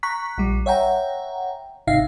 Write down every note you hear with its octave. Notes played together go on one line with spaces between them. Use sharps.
A#5 C#6 F#6 B6
A#1 G3
C#5 E5 F#5 G5 A#5
G#1 C3 D#4 E5 F5 C7